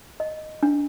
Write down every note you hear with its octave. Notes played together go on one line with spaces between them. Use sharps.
D#5
D4